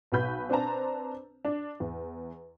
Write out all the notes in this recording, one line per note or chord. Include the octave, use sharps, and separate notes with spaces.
B1 B2 F#4 B4 B5 G6
C4 D4 B4 C5 A5 A#5
D4
E2